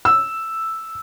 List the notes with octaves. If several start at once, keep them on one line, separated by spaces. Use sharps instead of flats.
E6